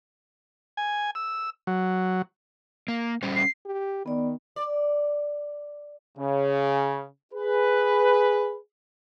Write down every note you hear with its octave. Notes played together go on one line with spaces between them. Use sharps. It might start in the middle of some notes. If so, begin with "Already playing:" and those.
G#5
E6
F#3
A#3
G3 C#4 C5
C7
G4
D#3 B3 D5
D5
C#3
G#4 B4